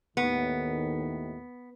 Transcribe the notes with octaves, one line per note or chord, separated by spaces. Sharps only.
D#2 A2 D#3 B3